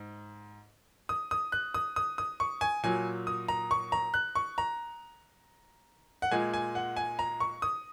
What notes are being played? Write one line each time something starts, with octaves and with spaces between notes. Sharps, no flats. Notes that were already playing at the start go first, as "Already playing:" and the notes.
Already playing: G#2
D#6
D#6
F#6
D#6
D#6
D#6
C#6
G#5
A#2 F#3 G#5
D#6
A#5
C#6
A#5
F#6
C#6
A#5
F#5
A#2 G#3 G#5
G#5
F#5
G#5
A#5
C#6
D#6